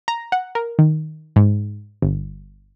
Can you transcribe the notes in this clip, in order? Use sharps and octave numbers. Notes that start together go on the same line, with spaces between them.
A#5
F#5
A#4
D#3
G#2
G1